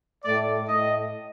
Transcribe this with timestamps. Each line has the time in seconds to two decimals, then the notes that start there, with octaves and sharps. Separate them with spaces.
0.25 A2 A3 D5
0.68 A2 A3 D#5